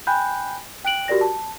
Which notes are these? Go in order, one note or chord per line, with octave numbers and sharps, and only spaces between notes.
G5 G#5 B5 F#6 G6
G5 F#6 D7 F#7
F#4 G4 A#4 D5 A#6
A5